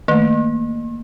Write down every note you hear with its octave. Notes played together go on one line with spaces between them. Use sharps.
D#3 A3 A#3